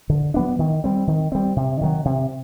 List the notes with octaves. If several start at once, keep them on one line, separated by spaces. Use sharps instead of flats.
D3
F#3 B3 D4
D#3
G3 C4
D#3
G3 C4
C3
D#3 F#3
C3